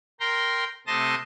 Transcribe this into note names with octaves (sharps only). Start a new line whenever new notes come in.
A#4 G5 A#5 C6
C3 A3 A5 C6 D#6 A#6